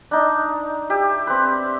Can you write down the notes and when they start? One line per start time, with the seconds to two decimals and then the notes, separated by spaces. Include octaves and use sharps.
0.11 D4 D#4
0.90 G4 E5
1.27 C4 B4